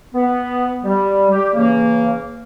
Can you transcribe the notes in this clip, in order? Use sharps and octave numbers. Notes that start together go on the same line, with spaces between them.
B3
G3
G3 G4
C#3 E3 A#3